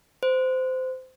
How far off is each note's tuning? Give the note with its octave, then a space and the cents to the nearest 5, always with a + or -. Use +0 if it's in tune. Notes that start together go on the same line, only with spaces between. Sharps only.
C5 -20